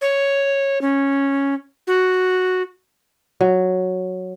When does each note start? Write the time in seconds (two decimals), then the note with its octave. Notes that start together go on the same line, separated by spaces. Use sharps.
0.01 C#5
0.81 C#4
1.87 F#4
3.41 F#3